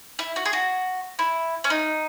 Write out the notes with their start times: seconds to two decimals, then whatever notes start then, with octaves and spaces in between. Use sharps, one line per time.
0.19 E4
0.36 F#4
0.46 G#4
0.53 F#4
1.19 E4
1.64 C#4
1.70 D#4